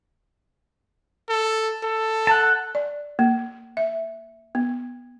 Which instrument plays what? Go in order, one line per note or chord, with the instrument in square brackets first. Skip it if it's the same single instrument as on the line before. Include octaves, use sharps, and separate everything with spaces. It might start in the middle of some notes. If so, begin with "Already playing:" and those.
[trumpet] A4
A4
[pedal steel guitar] F#5 A5
[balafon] D5
A#3
E5
B3